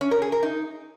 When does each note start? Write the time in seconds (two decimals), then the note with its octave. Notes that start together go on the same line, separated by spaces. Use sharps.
0.01 C#4
0.11 A#4
0.22 G#4
0.32 A#4
0.43 D#4